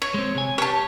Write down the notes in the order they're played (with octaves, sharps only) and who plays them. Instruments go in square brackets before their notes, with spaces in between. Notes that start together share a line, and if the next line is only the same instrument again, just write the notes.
[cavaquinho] C#5
[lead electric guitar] G#3 C4
C3 G#5
[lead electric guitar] G4 [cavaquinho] C#5 A5